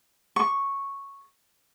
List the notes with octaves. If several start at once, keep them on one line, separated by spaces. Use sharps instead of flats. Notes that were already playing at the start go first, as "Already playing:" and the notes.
C#6